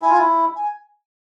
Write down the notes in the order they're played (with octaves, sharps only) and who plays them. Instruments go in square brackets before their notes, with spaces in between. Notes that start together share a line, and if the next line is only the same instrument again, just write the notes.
[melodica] E4 [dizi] G#5
[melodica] F4
E4
[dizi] G#5